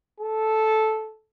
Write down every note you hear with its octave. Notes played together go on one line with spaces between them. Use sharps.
A4